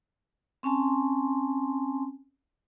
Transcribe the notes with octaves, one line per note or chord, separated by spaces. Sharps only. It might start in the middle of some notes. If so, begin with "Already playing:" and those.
C4 C#4 G#5 A5 C6